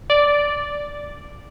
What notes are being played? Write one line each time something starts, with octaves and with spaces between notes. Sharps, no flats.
D5